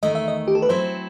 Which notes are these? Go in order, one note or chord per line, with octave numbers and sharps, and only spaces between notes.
E2 D#3 A3 D#5
E5
D#5
G4
A4
B4
F#3 C4 E4 A4 C5